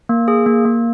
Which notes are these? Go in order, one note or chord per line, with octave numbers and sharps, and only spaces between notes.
A#3
G#4
A#3
A#3